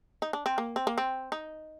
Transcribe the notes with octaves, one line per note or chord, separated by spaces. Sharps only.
D#4
D4
C4
A#3
C4
A#3
C4
D#4